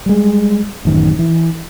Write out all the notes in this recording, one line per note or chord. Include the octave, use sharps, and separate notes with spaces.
G3 G#3
A1 F#2 D#3
E3